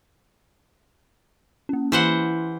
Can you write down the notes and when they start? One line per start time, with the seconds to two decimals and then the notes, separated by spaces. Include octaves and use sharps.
1.69 A#3 C#4
1.92 E3 E4 C5 F#5